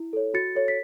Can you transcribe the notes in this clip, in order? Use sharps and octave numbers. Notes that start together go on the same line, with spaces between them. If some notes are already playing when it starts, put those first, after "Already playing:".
Already playing: E4
A4 C#5
F#4 A6 C#7
A4 C#5
B6